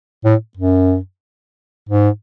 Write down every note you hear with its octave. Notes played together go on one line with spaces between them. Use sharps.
A2
F#2
G#2